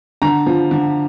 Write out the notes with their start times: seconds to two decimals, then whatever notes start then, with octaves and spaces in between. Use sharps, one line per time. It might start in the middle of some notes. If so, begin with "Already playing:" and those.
0.22 D3 A#5
0.46 F3
0.71 D3